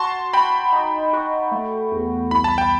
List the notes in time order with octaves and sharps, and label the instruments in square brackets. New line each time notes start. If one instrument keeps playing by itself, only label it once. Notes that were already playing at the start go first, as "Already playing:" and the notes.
Already playing: [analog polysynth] F#4 [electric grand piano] A5 C6
[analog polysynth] F#4 [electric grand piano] G5 B5
[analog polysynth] D#4
F#4
A3
E2
[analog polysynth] C2 [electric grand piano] B5
[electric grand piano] A5
G5